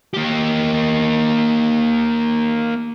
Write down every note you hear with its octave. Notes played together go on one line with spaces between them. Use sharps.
A#3 G4